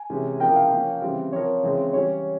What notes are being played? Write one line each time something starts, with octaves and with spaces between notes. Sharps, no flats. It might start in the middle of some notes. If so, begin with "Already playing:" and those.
Already playing: G#5
C3 E3 G#3 C#4
C#3 F3 A#3 E4 A#4 G5
F5
F3 A#3 C#4
C#3 E3 G3 C4
F3 C4 F4 A#4 C#5
C#3 E3 G#3 C4
E3 G3 C#4 C#5